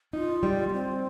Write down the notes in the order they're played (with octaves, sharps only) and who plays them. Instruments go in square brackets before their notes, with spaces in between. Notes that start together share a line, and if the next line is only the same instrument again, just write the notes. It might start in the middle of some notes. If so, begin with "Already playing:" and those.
[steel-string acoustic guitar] D#4 [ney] F4
[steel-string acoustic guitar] G3
[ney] A#3
C4